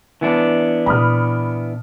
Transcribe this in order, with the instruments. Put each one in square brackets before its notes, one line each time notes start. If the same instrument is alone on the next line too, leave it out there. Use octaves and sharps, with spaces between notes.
[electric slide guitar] E3 B3 D4
[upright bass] A#2 [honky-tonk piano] B5 D#6 F6